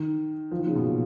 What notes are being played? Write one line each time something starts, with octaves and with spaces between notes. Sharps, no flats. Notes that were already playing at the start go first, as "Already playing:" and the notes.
Already playing: D#3
F3
D#3
C#3
B2
A#2